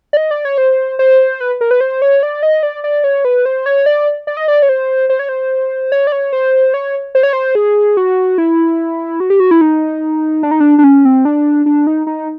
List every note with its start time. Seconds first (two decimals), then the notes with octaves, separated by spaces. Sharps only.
0.13 D5
0.17 D#5
0.31 D5
0.45 C#5
0.58 C5
0.99 C5
1.40 B4
1.61 A#4
1.71 B4
1.81 C5
2.02 C#5
2.23 D5
2.43 D#5
2.63 D5
2.84 D5
3.04 C#5
3.25 B4
3.46 C5
3.66 C#5
3.86 D5
4.27 D5
4.37 D#5
4.48 D5
4.62 C#5
4.69 C5
5.10 C5
5.19 C#5
5.29 C5
5.92 C#5
6.07 D5
6.12 C#5
6.33 C5
6.74 C#5
7.15 C5
7.23 C#5
7.33 C5
7.55 G#4
7.97 F#4
8.38 E4
9.20 F#4
9.30 G4
9.40 F#4
9.51 E4
9.61 D#4
10.43 D4
10.51 D#4
10.60 D4
10.79 D4
10.84 C#4
11.05 C4
11.25 D4
11.66 D4
11.87 D#4
12.07 D#4